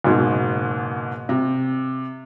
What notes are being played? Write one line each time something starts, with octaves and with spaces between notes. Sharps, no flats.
F#1 G#2 B2
C3